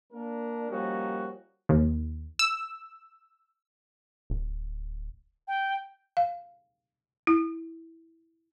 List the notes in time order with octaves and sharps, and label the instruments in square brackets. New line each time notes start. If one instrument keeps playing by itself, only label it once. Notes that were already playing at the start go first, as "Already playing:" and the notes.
[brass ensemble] A#3 D4 A#4
F3 G3 A#3 C#4 D#4 F#4
[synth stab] D#2
E6
[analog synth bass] D1
[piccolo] G5
[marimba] F5
E4